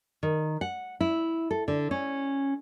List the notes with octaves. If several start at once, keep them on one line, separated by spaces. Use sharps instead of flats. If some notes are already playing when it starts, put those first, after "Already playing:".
D#3
F#5
E4
A4
D3
C#4